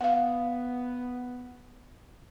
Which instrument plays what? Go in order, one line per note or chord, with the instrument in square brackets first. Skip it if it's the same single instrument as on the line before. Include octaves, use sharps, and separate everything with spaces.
[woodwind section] B3 [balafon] F5 F#5